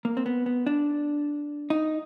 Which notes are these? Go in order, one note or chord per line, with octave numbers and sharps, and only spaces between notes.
A#3
C4
B3
B3
D4
D#4